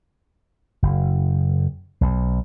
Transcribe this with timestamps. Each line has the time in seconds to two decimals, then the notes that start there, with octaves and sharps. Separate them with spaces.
0.82 F#1
2.01 B1